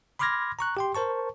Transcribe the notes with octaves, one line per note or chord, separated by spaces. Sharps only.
B5 C6 D6 F6 G#6 A#6
A#5 C#6 F#6
G4 G5 C6
A#4 C5 A5 C#6